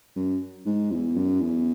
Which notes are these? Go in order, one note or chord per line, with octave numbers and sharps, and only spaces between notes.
F#2
G#2
E2
F#2
E2